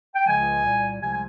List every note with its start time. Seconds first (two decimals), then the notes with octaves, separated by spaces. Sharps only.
0.15 G5
0.26 C#2 C#3 F3 G#3 G#5
0.63 C2 A#2 G3
1.01 C2 C3 F3 G#3 G#5
1.13 G#5